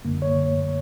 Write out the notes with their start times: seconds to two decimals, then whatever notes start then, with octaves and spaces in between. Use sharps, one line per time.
0.05 F#2 D3 A#3
0.22 C#5